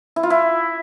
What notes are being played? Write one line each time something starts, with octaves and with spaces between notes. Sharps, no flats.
E4
F4
E4